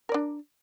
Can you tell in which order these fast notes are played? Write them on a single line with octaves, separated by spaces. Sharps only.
A#4 D5 D4